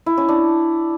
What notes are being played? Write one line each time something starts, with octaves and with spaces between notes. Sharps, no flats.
E4
C#4
D4